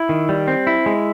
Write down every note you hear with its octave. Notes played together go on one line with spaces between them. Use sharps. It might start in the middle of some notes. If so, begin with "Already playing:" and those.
Already playing: E4
D#3
G3
C4
E4
G#3